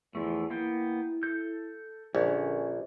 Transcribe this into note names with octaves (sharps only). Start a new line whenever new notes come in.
E2 E3 F3 A3
A#3 B3 E4 G5
A4 G6
A#1 D3 C#4